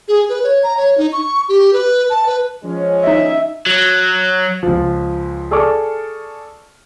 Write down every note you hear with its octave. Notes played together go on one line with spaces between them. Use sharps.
G#4
B4
C#5
A#5
C#5
D#4
C#6
G4
B4
A5
B4
F3 G#3 C#4
D#4 D#5 E5
F#3
C#2 F3
G#4 A4 D5 C#6 D6 F6